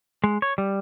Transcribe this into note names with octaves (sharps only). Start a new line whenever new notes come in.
G#3
C#5
G3